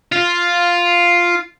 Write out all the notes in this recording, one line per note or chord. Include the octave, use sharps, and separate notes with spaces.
F4